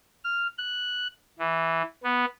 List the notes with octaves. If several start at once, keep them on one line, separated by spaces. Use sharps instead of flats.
F6
F#6
E3
B3